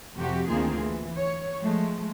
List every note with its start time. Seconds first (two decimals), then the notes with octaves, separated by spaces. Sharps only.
0.16 F2 C3 F#4 G4
0.48 D2 D#3 A#3 C4 F4 G#4
0.82 E3
1.16 C#5
1.59 F3 G#3 A3